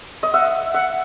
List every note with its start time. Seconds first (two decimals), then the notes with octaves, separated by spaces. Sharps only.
0.23 D#5
0.33 E5 F#5
0.74 E5 F#5